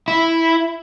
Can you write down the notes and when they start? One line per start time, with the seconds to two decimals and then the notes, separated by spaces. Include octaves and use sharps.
0.08 E4